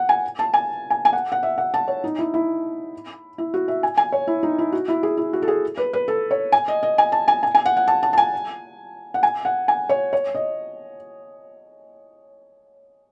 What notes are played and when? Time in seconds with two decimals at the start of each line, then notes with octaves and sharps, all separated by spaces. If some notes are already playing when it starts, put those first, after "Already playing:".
Already playing: F#5
0.09 G#5
0.39 A5
0.54 G#5
0.90 G#5
1.05 G#5
1.13 F#5
1.32 F#5
1.43 E5
1.58 F#5
1.74 A5
1.88 C#5
2.04 D#4
2.19 E4
2.34 E4
3.38 E4
3.54 F#4
3.68 E5
3.83 G#5
3.97 G#5
4.12 C#5
4.27 E4
4.43 D#4
4.59 E4
4.72 F#4
4.88 E4
5.03 G#4
5.17 E4
5.33 F#4
5.42 A4
5.48 G#4
5.78 B4
5.93 B4
6.08 A4
6.31 C#5
6.52 G#5
6.68 D#5
6.83 D#5
6.98 G#5
7.12 A5
7.28 G#5
7.43 G#5
7.55 G#5
7.66 F#5
7.77 F#5
7.88 A5
8.03 A5
8.13 A5
8.18 G#5
9.14 F#5
9.23 G#5
9.45 F#5
9.68 G#5
9.89 C#5
10.13 C#5
10.35 D#5